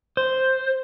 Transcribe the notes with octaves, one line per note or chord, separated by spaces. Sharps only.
C5